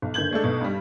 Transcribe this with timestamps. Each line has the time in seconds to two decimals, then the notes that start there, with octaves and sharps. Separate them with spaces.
0.02 B1
0.14 F#1 D3 G6 G#6 F#7
0.31 G#3 A3 D4 A4
0.43 B1 B2
0.61 G2 G3